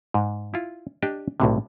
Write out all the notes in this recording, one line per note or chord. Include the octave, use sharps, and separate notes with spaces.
G#2
E4 F4
D4 G4 D5 D#5 A5
B1 A2 C3